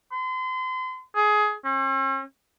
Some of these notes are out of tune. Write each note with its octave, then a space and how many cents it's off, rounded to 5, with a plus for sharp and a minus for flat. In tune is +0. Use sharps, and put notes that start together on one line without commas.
C6 -35
G#4 +20
C#4 -45